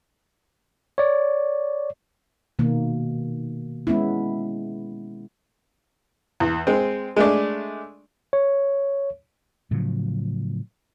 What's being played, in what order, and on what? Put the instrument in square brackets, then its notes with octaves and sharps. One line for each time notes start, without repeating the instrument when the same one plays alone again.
[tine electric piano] C#5 D5
[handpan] B2 D#3 A#3
G#3 B3 C#4 E4
[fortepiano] E2
G#3 C4
G#3 A3 D4
[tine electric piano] C#5
[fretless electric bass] A2 C#3 F3 F#3